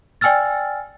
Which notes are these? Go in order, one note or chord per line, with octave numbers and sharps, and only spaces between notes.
D5 G5 G#5 E6 F6 A6